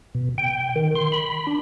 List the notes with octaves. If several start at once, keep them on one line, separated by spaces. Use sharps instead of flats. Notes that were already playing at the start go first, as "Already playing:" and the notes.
B2
G5
D#3
C6
B5
D4